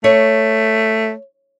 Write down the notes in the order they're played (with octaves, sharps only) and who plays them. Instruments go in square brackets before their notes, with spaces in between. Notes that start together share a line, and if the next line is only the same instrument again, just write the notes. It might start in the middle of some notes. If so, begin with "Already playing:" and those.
[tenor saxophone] A3 [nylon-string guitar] C#5